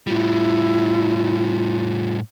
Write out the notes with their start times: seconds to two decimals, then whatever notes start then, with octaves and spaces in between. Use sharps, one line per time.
0.07 A2 G3 E4 F4